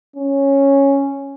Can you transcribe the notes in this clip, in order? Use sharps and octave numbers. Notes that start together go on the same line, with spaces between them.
C#4